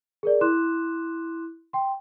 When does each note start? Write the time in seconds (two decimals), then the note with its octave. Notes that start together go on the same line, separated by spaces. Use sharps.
0.23 G#4 A#4 D5
0.41 E4 C6 D6 F#6 E7
1.73 G5 C6